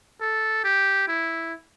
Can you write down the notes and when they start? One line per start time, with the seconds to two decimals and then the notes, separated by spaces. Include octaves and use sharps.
0.21 A4
0.64 G4
1.07 E4